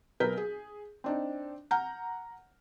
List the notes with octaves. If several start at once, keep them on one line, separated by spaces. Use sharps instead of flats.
B1 A#4 B4 G6 B6
G#4
C4 D4 D#4
F#5 A#5 F6 G6